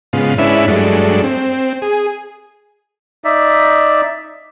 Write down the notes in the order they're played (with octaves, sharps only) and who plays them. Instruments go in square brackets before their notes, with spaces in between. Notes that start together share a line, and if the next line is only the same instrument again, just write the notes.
[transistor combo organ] G#2 C#3 B3 F4
G#2 C#4 D4 E4 B4 E5
G2 F#3 G#3 A3 D4
C4
G#4
[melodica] D#4 D5 E5